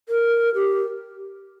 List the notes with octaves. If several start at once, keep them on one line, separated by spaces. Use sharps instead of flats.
A#4
G4